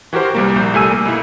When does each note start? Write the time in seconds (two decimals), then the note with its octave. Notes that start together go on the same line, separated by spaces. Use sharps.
0.13 E3 F#4 G4 A#4 C5
0.35 C2 G3 A#3
0.56 A#1 G6
0.74 C2 G3 A3 G#5 E6 D#7
0.91 A#3
1.05 B1 E4